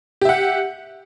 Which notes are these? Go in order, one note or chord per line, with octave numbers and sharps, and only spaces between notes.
G4 E5 F#5